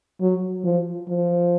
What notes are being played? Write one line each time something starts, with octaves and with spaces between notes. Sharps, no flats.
F#3
F3
F3